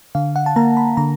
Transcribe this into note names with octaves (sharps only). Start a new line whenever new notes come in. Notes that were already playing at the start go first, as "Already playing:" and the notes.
D3 F5
F#5
A5
A#3 A#5
B5
D3 A#5